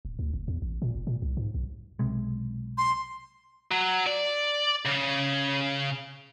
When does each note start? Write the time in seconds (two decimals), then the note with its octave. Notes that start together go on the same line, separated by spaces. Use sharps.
0.05 D1
0.19 D2
0.34 F#1
0.48 E2
0.62 A1
0.82 A#2
0.95 F1
1.07 A#2
1.22 C2
1.37 G#2
1.54 B1
1.99 B1 C3 G#3
2.78 C6
3.71 F#3
4.07 D5
4.85 C#3